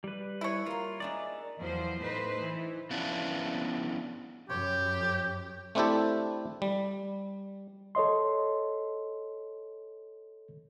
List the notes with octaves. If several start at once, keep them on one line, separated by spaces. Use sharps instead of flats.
G3 B4
E4 C5 C#5
A#3 F4 C6
G#3 D4 D#4 D5 E5
E2 F3 F#3 C5
A2 D#4 B4 C5
E3
F3 B3 C#4 D4 E4
F#2 G4 C#5
A3 C4 D4 E4 G4 A4
G3
A4 C#5 D#5 C6